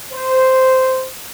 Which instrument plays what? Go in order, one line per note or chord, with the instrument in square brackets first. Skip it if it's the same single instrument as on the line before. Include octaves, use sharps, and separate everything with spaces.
[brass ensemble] C5